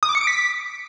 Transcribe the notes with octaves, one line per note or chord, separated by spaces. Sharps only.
D#6
D6
C#7
D7
B6